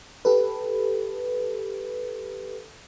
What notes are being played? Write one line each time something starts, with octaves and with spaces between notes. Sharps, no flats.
G4 A4 B4